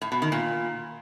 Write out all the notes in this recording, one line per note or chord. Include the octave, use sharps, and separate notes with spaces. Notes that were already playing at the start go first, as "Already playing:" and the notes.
A2
B2
D#3
A#2